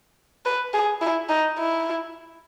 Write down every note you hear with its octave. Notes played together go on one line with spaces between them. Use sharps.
B4
G#4
E4
D#4
E4